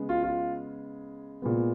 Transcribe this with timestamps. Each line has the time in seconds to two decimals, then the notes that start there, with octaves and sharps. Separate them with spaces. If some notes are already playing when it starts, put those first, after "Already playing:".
Already playing: C#3 G#3 B3
0.09 F4
0.24 F4
1.42 A#2 G#3 B3